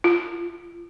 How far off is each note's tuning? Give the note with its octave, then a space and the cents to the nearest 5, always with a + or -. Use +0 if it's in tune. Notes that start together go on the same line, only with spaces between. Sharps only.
F4 -35